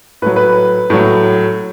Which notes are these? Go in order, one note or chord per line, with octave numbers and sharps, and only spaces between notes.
A2 F#3 B4
B4
A2 F#3